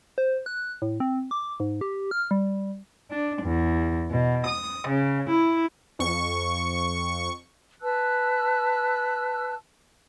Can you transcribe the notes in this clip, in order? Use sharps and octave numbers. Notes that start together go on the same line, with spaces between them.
C5
F#6
A2
C4
D6
G#2
G4
F6
G3
D4
E2
B2
D#6
C#3
E4
F2 C#6
B4 A5 E6 F#6